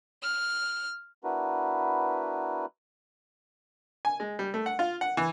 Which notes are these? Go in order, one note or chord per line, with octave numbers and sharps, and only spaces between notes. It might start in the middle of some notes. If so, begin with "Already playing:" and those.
F6
B3 D4 E4 F#4 A#4 B4
G#5
G#3
G3
A3
F#5
F4
F#5
E3